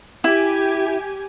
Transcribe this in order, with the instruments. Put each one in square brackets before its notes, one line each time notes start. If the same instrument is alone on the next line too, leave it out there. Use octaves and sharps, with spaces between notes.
[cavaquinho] E4 [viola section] G4 G#5